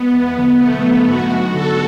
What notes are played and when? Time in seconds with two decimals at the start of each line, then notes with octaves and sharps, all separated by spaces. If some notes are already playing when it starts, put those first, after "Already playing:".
Already playing: G#3 B3
0.12 E2
0.35 D3 F#3
0.59 B2 A3
0.82 F#3 C#4 E4
1.06 G#2 F#4
1.30 G#3 B3 D4
1.53 D3 A4